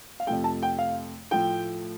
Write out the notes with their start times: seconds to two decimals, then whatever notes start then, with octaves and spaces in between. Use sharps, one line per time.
0.20 F5
0.27 F2 C3 F3 A3 G5
0.44 A5
0.62 G5
0.79 F5
1.31 A2 F3 A3 G5